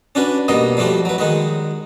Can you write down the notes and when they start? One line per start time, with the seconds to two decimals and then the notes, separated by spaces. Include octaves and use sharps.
0.15 C#4 D4 F#4 B4
0.48 B2 G3 A#3 D#5
0.77 F3 G3 A3 F#4 G4
1.05 F#3 B4
1.18 D#3 G#3 F#4